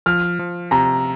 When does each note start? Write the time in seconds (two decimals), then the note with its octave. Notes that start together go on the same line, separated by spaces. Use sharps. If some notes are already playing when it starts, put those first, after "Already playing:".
0.06 F3 F6
0.39 F3
0.71 C3 A#5